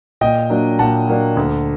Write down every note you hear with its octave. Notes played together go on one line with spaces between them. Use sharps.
A#2 D#5 G5
F#3 A#3 D4
A#2 F#5 A5
F#3 A#3 D4
D2